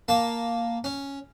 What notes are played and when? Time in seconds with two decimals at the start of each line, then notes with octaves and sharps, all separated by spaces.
0.08 A#3 A5
0.84 C#4